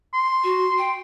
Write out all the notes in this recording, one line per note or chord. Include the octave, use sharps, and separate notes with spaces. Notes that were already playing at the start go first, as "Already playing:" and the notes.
C6
F#4
G5